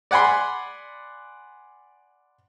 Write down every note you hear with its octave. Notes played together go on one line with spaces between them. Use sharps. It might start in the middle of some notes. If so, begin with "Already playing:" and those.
D5 F#5 G#5 B5 C6